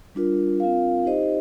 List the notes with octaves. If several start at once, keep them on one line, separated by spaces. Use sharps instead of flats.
G3 D4 F4 A#4
C4 F4 A#4 F5
D#4 G4 C5 D#5